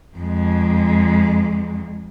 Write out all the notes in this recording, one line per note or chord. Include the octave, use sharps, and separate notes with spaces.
F2 G#3